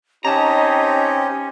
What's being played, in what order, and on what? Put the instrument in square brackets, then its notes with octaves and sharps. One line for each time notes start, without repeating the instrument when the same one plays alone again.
[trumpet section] C4 D#4 [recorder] C#4 [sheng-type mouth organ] G4 C#5 D#5 [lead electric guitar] A5 A#5